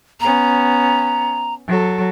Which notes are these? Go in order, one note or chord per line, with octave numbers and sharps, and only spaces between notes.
B3 C#4 A#5
F#3 A4